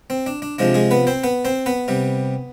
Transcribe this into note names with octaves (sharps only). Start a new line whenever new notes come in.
C4
D4
D4
C3 F3 G#3 D4
G#3 G#4
B3 B4
C4 C5
B3 B4
C4 C5
B3 B4
C3 G3